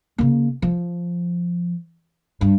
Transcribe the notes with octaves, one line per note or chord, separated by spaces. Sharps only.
C#3 A#3
F3
G2